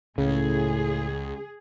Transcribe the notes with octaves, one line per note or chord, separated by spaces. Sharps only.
C#2 A2 C#3 G#4